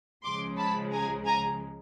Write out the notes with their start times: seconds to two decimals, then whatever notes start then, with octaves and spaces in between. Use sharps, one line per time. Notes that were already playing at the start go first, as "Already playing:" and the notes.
0.23 C#2 C#3 F3 G#3 C6 D6
0.57 A5 B5
0.91 G#5 A#5
1.25 G#5 A#5